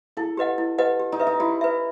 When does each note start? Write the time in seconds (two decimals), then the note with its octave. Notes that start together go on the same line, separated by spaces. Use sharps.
0.17 E4 A4
0.37 G4 B4 D#5 F#5
0.58 E4
0.78 G4 B4 D#5 F#5
1.00 G4
1.12 D#4
1.20 B4 E5
1.27 D#4
1.40 E4 G4
1.61 B4 E5